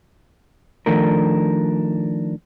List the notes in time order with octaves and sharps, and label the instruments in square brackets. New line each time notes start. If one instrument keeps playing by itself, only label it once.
[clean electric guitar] D#3 F3 A3 D4 A#4